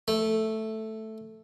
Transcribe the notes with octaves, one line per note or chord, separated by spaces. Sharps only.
A3